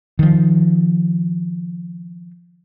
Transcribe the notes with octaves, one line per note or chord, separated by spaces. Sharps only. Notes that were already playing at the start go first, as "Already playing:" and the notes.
D#3 F3